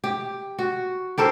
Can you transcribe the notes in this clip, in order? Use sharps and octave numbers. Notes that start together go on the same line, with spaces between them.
G4
F#4
G4 A4 A#4 C5